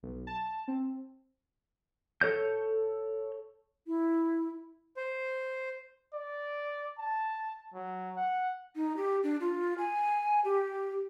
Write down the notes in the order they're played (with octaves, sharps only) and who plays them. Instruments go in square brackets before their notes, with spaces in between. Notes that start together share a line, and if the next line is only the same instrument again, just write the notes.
[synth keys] B1
A5
C4
[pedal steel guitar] A4 C#5 G6
[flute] E4
[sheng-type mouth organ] C5
[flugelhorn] D5
A5
F#3
F#5
[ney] D#4
G4
D4
F4
G#5
G4